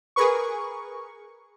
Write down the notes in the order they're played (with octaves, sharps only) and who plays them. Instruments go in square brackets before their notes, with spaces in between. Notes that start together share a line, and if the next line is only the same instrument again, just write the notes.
[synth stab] G#4 A#4 B4 C#6